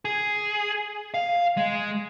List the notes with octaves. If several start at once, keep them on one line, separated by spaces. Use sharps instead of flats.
G#4
F5
G#3